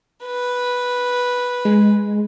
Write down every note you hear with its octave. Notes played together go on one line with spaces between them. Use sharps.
B4
G#3